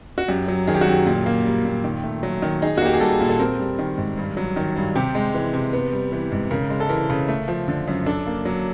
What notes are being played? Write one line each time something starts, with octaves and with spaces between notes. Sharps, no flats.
F#4
F#2 G4
F#3
D#3 G#4
G4
F#4
F#2 G4
A#2
A#3
G3
A#2
D#3
A3
F#3
D#3
D#4 G#4
F#4
A#3 G4
G#4
G3 A4
A#2
A4
C4 A#4
G3
D#3
G#2
G2
F#3
D#3
G2
C3 G4
G#3
E3
C3
B3
G3
E3
G#2
C#3 A#4
G#3
A4
E3 A#4
C#3
A3
F3
D3
F#2
D4 A4
A#3
F#3